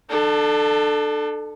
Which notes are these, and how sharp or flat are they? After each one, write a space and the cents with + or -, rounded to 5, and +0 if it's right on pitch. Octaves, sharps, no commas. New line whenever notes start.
D4 +35 A4 +0